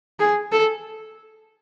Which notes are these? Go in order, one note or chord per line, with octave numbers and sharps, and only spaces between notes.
G#4
A4